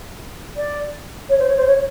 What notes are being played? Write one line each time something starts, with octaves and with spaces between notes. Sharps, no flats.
D5
C#5
C5
C#5
C5
C#5